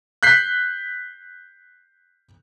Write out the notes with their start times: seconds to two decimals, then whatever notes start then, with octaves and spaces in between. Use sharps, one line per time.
0.23 F#6 G6 B6 C7